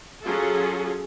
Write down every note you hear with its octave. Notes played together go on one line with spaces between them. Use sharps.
F#3 C#4 F4 G#4 A4